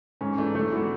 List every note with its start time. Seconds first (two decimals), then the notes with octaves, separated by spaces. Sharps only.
0.21 G#2 C#4
0.38 E3 A3 D4
0.55 G#2 A3
0.73 E3 B3 F#4